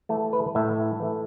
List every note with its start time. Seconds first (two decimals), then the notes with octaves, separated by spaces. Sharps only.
0.09 E3 A3 A4
0.33 B4
0.55 A2 E5
1.00 E3 A3